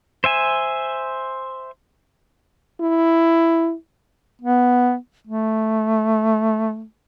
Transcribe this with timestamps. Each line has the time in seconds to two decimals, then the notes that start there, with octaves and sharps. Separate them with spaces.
0.24 C5 E5 G#5
2.80 E4
4.41 B3
5.27 A3